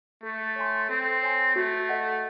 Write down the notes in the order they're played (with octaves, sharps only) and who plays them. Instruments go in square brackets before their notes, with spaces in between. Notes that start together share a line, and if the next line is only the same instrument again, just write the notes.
[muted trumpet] A3 [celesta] A4
[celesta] C#5 G#5 C6
[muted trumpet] C4 [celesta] A4
[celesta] C#5 G#5 C6
[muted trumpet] A3 [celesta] F#4
[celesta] A4 D#5 F#5